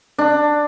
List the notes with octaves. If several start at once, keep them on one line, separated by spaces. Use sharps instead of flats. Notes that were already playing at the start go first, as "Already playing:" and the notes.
D4